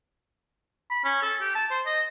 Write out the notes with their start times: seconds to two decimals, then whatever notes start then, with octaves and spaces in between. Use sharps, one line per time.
0.90 B5
1.04 C#4
1.22 A4
1.41 G4
1.55 A5
1.70 C5
1.86 D#5